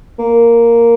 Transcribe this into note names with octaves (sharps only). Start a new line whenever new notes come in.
A#3